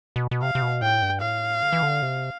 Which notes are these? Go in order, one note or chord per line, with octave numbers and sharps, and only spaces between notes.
B2
B2
C3 F5
C3
B2
A2 G5
G2
A2 F5
D3
E3
D3
C3